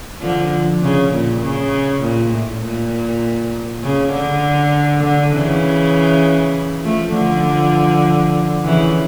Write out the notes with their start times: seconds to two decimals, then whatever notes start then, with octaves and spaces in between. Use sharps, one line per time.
0.21 D3 F3
0.82 C#3
1.12 A#2
1.42 C#3
2.01 A#2
2.32 A2
2.62 A#2
3.83 C#3
4.12 D3
5.03 D3
5.33 C#3 E3
6.84 F3 A3
7.14 D3 F3
8.64 C#3 E3